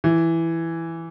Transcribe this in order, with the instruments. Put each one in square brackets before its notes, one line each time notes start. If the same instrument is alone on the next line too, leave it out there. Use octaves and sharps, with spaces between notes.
[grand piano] E3